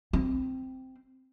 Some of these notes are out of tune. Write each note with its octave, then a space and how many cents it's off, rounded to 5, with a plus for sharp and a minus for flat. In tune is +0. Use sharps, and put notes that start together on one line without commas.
C4 -5